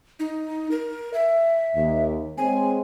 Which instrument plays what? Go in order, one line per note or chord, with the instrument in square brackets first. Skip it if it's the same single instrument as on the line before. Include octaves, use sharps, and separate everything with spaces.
[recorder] D#4
A#4
E5
[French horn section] D#2
[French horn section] G#3 C4 C#5 [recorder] G#5